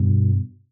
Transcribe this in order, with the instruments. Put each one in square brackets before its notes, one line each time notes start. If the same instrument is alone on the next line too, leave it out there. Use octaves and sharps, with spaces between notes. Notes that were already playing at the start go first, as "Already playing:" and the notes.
Already playing: [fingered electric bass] G2 B2